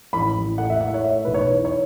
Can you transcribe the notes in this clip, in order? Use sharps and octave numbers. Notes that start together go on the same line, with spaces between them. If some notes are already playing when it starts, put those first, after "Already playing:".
A1 B5
A1
A3 F#5
E5
A2 F#5
C#5
A3 E5
B1 B4
C#5
E3
C#5